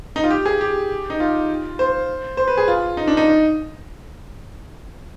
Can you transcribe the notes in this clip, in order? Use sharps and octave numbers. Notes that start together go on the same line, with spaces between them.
D#4
F4
G4
G#4
G4
D#4
F4
C5
C5
B4
G#4
F4
D#4
D4
D#4